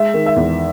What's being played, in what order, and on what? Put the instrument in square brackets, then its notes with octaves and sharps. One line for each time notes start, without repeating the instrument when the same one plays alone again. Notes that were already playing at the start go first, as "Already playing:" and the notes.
Already playing: [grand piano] G#3 E5
D#3
E5
E2